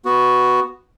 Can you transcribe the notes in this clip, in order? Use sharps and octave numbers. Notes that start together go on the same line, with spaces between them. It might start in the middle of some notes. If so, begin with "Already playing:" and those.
B3 F#4